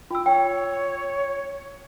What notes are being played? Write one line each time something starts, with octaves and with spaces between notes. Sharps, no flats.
F4 G5 E6
C#5 G5